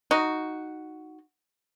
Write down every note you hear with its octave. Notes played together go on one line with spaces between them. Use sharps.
D#4 F#4